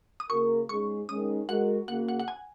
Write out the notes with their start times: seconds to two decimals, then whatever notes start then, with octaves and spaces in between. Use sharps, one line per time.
0.20 D#6
0.30 C#3 A#3 F#4 A#4 C#6
0.69 G#2 G#3 C#4 G#4 C#6
1.09 D#3 G#3 C#4 D#6
1.48 G#3 F#4 A#4 F#5
1.88 C#3 A#3 F#4 F#5
2.08 F#5
2.20 F#5
2.28 G#5